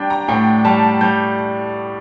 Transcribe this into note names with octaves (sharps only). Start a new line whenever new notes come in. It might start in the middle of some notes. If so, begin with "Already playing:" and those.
Already playing: G3 D4 G5
A#5
A2 G5
G3 A5
G3 G6